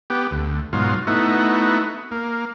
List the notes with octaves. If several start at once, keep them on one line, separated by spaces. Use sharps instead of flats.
B3 G4
D2
G#2 B2 F#3 F4
A3 B3 D#4 E4 F#4
A#3